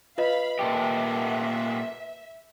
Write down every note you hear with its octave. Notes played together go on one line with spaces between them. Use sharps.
F4 B4 D#5 F5 B5
A#2 A3 G4 E5